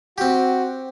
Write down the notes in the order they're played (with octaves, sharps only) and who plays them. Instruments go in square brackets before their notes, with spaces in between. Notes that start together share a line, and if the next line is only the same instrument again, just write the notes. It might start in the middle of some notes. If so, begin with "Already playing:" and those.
[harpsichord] C4 G4 [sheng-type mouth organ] F#4